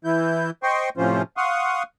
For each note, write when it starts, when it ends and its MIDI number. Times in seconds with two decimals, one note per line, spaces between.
0.05 0.50 52
0.05 0.50 64
0.05 0.50 91
0.63 0.89 72
0.63 0.89 75
0.63 0.89 79
0.63 0.89 84
0.63 0.89 85
0.97 1.22 45
0.97 1.22 48
0.97 1.22 53
0.97 1.22 61
0.97 1.22 65
0.97 1.22 72
1.37 1.83 77
1.37 1.83 78
1.37 1.83 84
1.37 1.83 85
1.37 1.83 87